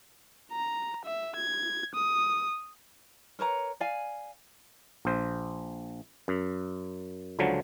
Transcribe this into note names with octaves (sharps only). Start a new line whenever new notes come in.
A#5
E5
G#6
D#6
A#4 B4 C#5 A#5
D5 F5 G#5
A#1 C5
F#2
C#2 D3 F3 F#3